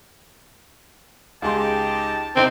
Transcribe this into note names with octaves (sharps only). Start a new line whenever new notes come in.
C#2 D#4 G4 G#4 A5 C6
C3 C4 D#4 C5